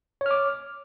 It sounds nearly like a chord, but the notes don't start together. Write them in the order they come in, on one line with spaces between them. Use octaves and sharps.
C#5 F6 D6